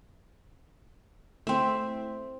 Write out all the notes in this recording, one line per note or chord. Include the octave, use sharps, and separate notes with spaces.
A3 C4 E4 E5